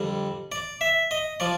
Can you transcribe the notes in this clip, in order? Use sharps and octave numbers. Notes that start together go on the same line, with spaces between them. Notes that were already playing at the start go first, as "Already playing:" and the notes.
Already playing: F2 D3 G3
D5
E5
D#5
F3 D5